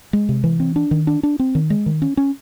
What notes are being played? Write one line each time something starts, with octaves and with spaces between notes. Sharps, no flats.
G#3
C3
E3
C4
D4
D#3
D4
D4
C4
D#3
G#3
D#3
C#4
C#4